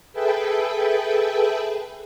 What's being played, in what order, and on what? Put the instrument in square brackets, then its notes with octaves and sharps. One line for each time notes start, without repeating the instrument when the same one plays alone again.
[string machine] G#4 A4 B4 E5 G5